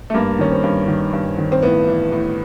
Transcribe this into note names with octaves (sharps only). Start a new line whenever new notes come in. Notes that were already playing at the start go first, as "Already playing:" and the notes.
A3
G2 A#3
D#3 C#4
C4
G2
D#3
G2
D#3
C4
A2 B3
E3
A2